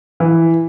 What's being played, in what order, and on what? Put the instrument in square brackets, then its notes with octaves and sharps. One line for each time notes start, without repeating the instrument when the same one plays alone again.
[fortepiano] E3